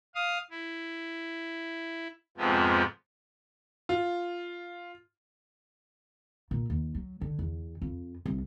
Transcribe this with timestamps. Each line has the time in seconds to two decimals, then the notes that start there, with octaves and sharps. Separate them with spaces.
0.15 F5 D#6
0.50 E4
2.37 F2 G#2 C3 F3 B3
3.89 F4
6.51 A#2
6.70 D#2
6.95 F#3
7.21 D3
7.39 E2
7.82 F2
8.26 C2